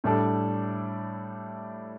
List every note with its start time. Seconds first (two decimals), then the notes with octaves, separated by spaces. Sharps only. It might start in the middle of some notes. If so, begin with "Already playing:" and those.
0.04 A2 G3 D4 A4